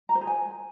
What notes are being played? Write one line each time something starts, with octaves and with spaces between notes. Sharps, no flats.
A#5
C5
G#4
G#5